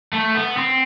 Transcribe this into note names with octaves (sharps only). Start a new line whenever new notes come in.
A3
B3
C4